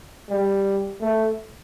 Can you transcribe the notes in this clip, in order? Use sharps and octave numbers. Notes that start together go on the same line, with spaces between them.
G3
A3